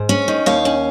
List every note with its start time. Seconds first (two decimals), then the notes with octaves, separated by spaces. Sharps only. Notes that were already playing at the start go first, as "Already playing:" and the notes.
Already playing: G#2
0.09 C#4
0.28 D#3
0.46 D#2 C#5 F5
0.65 C#4